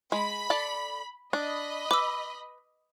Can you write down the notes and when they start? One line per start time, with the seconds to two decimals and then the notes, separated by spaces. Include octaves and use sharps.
0.12 G#3 B5
0.50 A4 D5 A5
1.33 D4 D#5 B5
1.91 B4 D6 E6